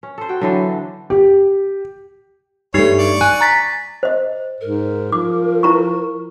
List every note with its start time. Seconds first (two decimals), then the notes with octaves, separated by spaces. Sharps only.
0.03 C#4
0.18 A4 C5
0.29 F#4 G5
0.41 D3 E3 F#3 D4
1.10 G4
2.74 G2 A3 D#4 G4 C#5
2.99 D5 C#6
3.21 G#5 F#6
3.41 A#5 A6 B6
4.03 C5 D#5
4.61 G#2 A#4
5.12 F3 D6
5.63 E4 A#5 C#6